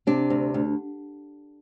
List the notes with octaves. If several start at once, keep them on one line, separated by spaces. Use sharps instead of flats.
C3 D4
D2
D2